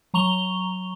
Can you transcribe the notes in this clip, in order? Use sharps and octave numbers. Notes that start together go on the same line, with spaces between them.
F#3 A#5 C#6 F7 G7